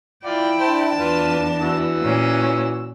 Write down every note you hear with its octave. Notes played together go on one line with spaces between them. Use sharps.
E4 F4 D5 G5
D4 C5 A5
E2 F4 B4
E3 F#4 E6
A#2 C#4